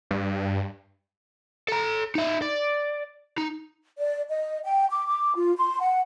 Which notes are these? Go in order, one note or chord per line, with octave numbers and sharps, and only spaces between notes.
G2
A4 A#5
D#4 E5
D5
D#4
D5
D#5
G5
D6
D6
F4
C6
F#5